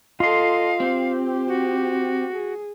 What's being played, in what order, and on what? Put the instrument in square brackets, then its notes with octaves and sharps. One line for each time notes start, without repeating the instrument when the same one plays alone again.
[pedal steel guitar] F4 C6 [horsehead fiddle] A4 D#5 [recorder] F5
[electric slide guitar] C4 [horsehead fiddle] G4
[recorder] F#4
[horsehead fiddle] G#4